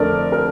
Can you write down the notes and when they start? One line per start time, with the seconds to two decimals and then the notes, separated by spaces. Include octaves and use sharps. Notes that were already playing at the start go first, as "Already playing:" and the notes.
Already playing: F2 D3 A3 A#4 D5
0.32 A#4